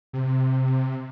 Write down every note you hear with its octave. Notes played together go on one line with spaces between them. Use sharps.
C3